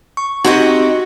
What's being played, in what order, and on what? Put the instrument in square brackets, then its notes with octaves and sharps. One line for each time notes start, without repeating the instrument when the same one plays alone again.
[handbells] C#6
[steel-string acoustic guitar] C4 G4 D#5 [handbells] D#4 [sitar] F#4